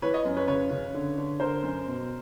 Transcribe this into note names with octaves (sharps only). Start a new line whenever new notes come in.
E3 B4 C#5
C#5 D#5
F#2
B4 C#5
C#3 B4 C#5
C#3
D3
D3
D3 A#4 C5
F#2
B2